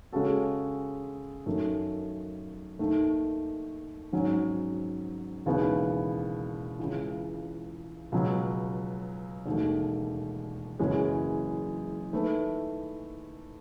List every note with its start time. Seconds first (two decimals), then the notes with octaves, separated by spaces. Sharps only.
0.13 C#3 G#3 C#4 F#4 A4
1.46 F#2 D#3 A3
2.79 D#2 D#3 A3
4.13 G#1 G#2 F#3 C#4
5.46 E1 D#2 C#3 E3 B3
6.79 C#2 C#3 E3
8.12 C#2 B2 F#3
9.46 E1 D#2 D#3 A3
10.79 F#1 F#2 E3 G#3 C#4
12.13 D#3 A3 E4 B4